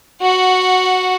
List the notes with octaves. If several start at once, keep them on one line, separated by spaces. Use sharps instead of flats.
F#4 F#5